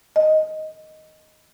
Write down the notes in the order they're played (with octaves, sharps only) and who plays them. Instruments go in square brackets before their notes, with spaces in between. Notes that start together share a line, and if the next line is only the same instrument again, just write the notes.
[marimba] D#5